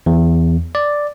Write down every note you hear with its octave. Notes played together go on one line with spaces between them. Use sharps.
E2
D5